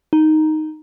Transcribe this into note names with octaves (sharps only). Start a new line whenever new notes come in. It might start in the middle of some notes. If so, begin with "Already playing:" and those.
D#4